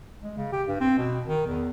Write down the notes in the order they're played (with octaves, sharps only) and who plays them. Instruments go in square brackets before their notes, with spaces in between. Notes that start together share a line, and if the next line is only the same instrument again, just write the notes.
[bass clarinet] G#3
C#3
G4
G2
C4
B2
D#3
E2